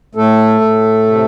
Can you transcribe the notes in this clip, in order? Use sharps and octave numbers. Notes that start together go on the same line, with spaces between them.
A2 A3 A4
A2
C3